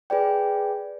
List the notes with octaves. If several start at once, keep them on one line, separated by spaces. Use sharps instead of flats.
G#4 B4 D5 G5